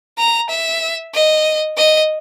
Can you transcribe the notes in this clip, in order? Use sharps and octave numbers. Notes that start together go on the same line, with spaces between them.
A#5
E5
D#5
D#5